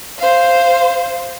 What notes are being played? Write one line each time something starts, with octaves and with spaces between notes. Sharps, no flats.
C5 F5